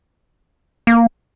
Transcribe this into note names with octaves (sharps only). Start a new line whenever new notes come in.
A#3